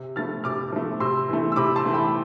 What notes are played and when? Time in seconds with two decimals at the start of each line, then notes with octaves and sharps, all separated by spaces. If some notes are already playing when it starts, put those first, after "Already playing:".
Already playing: C3
0.16 F3 A3 F6 A6
0.44 C3 D6 F6
0.72 F3 A3
1.00 C3 C6 E6
1.29 E3 A3
1.52 E6
1.56 C3 B5 D6
1.76 A5 C6
1.85 E3 A3
1.94 G5 B5